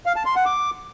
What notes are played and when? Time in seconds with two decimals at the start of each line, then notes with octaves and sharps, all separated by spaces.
0.06 F5
0.16 A5
0.26 C6
0.36 F#5
0.45 D6